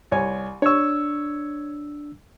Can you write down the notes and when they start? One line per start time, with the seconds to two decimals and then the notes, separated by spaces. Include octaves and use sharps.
0.12 C2 C#5 G#5
0.62 D4 C#5 C#6 E6